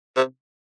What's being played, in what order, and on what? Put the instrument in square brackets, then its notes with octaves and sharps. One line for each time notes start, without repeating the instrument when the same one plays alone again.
[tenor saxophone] C3